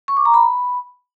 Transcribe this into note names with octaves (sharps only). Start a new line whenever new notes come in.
C#6
D6
A#5
B5